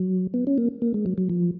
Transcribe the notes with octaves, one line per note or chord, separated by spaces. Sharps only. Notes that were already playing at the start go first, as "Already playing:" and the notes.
Already playing: F#3
B3
C#4
A#3
A#3
G#3
F#3
F#3
F3